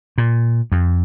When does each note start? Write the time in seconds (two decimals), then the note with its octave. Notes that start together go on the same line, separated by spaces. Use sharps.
0.18 A#2
0.72 F2